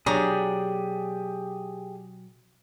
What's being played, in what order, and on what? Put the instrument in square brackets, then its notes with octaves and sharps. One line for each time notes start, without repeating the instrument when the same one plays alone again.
[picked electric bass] B2 F#3 [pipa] D4 C#5 A#5 [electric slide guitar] G4 G#4